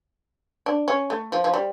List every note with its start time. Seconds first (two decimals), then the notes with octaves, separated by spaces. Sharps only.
0.66 D4
0.88 C#4
1.10 A3
1.32 F3
1.44 F3
1.54 G3